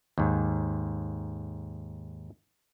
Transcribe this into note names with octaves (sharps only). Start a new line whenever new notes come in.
D#2 G#2